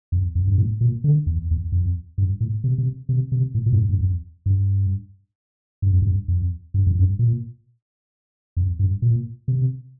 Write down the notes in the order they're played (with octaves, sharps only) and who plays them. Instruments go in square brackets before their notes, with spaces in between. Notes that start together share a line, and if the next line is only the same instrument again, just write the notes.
[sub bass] F2
F2
G2
A2
A#2
D3
E2
E2
F2
G2
A2
C3
C3
C3
C3
A2
A#2
G2
A2
G2
F2
G2
G2
F2
G2
F2
G2
F2
G2
A#2
F2
G2
A#2
C3